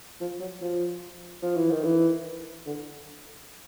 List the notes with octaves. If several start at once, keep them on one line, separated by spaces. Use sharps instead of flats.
F3
F#3
F3
F3
E3
D#3
E3
D3